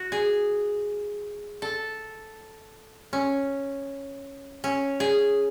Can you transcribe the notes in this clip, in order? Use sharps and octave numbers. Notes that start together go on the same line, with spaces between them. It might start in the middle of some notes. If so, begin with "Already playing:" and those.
Already playing: F#4
G#4
A4
C#4
C#4
G#4